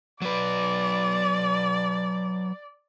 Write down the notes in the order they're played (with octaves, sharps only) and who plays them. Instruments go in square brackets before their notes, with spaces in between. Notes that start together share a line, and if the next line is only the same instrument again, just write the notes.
[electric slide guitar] F#3 B4 [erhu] D5